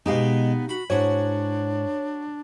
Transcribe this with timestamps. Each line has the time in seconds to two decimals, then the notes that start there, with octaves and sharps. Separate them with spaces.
0.06 B2 G#3 B3 D#4 G4 F5
0.69 F#4 B5
0.90 G#2 D4 E4 F#4 C#5